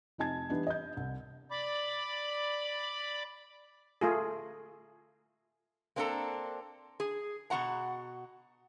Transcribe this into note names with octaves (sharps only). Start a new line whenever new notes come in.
F1 C3 D#4 G#5 A5 G#6
E3 G3 B3 D4 D#4
D#5 G6
C2
D5 B5 D6
A3 F4 G#4
A#3 C4 D4 F4 A4 A#5
G#4
B2 A3 F#4 F#5 A#5